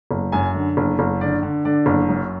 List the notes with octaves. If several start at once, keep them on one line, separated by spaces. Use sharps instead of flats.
F#1
F#2 G#5
D3
F#1
F#1
D3 D5
D3
D3 D5
F#1
F#2